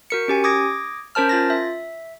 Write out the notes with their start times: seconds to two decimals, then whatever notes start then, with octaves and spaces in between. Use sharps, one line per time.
0.10 F#4 A#4 C#7
0.28 C#4 G4 G#5
0.44 D6 D#6 G#6 A#6 D7
1.15 C#4 A#4 C5 A5 F6
1.29 F4 A6 A#6
1.50 E5